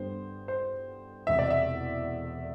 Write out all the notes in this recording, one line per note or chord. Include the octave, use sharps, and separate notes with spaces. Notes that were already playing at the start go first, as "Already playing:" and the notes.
Already playing: G2 D3 G3 B3 C5
C5
E1 E2 C3 E5
D5
E5